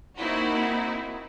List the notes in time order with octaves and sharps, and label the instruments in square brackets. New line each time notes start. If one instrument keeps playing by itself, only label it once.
[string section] A#3 C4 D#4 E4 F#4